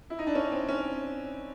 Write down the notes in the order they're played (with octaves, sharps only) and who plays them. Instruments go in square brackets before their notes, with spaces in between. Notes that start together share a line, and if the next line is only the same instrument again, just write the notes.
[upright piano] E4
D#4
D4
C#4
C4
C#4